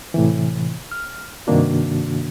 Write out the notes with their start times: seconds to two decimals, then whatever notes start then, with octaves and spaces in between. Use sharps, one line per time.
0.14 A2 C3 E3
0.91 F6
1.47 G2 C3 D#3 A#3 D4 F#4